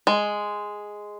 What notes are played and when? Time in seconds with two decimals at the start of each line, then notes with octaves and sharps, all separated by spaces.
0.07 G#3